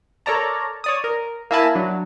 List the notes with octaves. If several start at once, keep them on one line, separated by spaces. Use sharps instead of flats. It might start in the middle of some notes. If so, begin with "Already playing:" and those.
A4 A#4 C#5 D5 A5 A#5
C#5 D5 D#6
A#4
A#3 E4 E5 G#5 A5 B5
F#3 D4